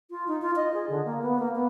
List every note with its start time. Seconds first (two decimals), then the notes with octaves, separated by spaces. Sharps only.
0.11 F4
0.28 D#4
0.42 F4
0.56 D#5
0.74 G#4
0.89 D3
1.05 A#3
1.22 B3
1.39 A#3
1.55 B3